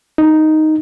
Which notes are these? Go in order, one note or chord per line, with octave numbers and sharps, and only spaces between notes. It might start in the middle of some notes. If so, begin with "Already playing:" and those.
D#4